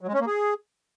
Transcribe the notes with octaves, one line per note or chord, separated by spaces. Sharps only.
F#3
G#3
C#4
A#3
G#4